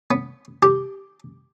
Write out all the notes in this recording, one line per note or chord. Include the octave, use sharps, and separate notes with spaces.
B3
G4